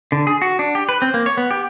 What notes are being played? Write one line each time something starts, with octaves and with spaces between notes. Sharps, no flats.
D3
G#4
F#4
D4
G4
B4
C4
A#3
C#5
B3
G4